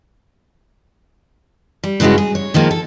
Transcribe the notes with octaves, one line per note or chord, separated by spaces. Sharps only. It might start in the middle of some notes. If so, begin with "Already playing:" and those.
G3
G2 C#3 G#3 C#4 E4 F#4
G#4
C#5
D#3 F3 G#3 A#3
A4